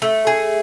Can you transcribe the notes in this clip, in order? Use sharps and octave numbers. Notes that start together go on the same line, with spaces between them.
A3
G#4